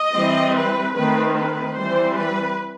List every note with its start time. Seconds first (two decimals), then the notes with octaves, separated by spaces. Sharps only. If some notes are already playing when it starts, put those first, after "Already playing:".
Already playing: D#5
0.15 E3 G3 C4
0.55 B4
0.95 D#3 A3 C4 B4
1.36 B4
1.76 E3 G3 C4 C5
2.16 B4